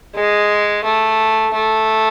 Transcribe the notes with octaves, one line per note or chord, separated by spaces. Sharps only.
G#3
A3
A3